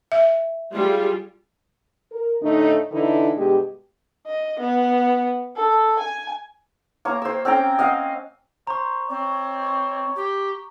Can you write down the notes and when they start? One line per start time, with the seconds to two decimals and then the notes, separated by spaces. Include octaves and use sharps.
0.12 E5
0.73 G3 F4 G#4
2.12 A#4
2.42 A2 D3 A3 D#4
2.91 D3 E3 D#4 E4 A4
3.36 G2 B2 G#3 G4
4.26 D#5
4.59 B3
5.56 A4
5.99 G#5
7.05 A#3 C#5 A#5
7.22 C5 E6
7.45 C4 C#4 G5 A#5
7.79 D#5 F5 F#5
8.67 C5 A#5 C#6
9.10 C4 C#5
10.16 G4